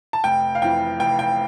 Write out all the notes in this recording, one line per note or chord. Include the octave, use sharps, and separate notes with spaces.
A5
F1 G5
F5
F2 E3 G5
F1 G5
G5